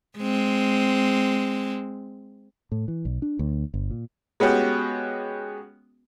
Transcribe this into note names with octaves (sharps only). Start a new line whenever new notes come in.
G#3 C4
A2
E3
B1
D4
D2
G1
A#2
G#3 B3 C#4 F#4 G4